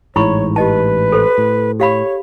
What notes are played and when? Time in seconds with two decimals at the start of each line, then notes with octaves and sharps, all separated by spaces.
0.16 A1 G#2 E4 C#5 B5 C#6
0.56 G4 B4 D#5 A5
1.12 A4 C5 C6
1.38 A2
1.80 G4 C#5 F5 B5